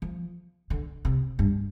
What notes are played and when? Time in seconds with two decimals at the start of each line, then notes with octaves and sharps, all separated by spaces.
0.02 F3
0.70 D3
1.05 C3
1.39 G2